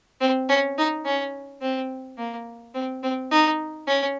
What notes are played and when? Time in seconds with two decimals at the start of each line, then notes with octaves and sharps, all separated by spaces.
0.21 C4
0.49 C#4
0.78 D#4
1.05 C#4
1.61 C4
2.18 A#3
2.74 C4
3.03 C4
3.31 D#4
3.87 C#4